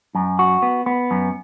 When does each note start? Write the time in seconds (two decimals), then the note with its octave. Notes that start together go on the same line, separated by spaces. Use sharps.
0.15 F#2
0.39 F#4
0.62 B3
0.86 B3
1.11 F#2